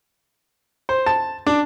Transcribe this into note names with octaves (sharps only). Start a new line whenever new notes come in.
C5
A5
D4